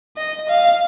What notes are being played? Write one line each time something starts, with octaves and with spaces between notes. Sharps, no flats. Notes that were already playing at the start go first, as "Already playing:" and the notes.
D#5
F5